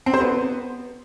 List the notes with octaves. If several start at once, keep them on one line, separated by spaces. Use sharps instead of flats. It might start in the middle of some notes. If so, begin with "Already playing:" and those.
C4
C5
B3